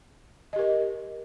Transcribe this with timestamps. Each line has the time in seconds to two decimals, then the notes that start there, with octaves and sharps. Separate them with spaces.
0.53 D#5
0.56 G4
0.59 A#4